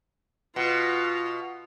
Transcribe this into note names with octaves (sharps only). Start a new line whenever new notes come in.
B2 F4